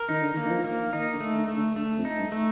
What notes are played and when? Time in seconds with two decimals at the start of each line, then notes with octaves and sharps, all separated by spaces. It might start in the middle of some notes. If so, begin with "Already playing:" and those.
Already playing: A#4
0.09 D#3 D#4
0.21 D3
0.34 D#3
0.37 A#3
0.46 D#3
0.50 F3
0.64 A#3
0.93 D#3 D#4
1.13 D3
1.20 A3
1.35 D3
1.48 A3
1.56 D3
1.76 D3 A3
1.98 F2
2.05 D#4
2.19 G2
2.32 A3